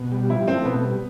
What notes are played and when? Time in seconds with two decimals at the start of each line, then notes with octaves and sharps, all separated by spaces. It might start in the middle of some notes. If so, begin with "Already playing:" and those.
Already playing: B2
0.12 G3
0.29 F3 E4
0.47 A3 C4
0.65 B2 B3
0.84 G3